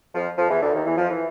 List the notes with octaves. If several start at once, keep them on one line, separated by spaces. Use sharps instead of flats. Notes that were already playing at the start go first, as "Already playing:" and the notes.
F2 F3
F2 F3
E2 E3
D2 D3
D#2 D#3
E2 E3
F2 F3
E3